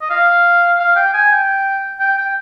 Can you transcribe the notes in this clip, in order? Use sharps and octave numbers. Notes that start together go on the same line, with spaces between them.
D#5
F5
F5
G5
G#5
G5
G5
G5